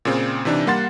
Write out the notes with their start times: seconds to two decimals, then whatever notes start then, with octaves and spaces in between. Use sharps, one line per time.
0.05 A#2 C#3 C4
0.45 C3 E3 D4 D#4
0.67 G3 A#3 F#5 C6 A6